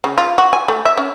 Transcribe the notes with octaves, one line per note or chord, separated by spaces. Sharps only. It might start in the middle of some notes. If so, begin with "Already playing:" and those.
C#3
F4
F#4
G#5
A3
E5
C#4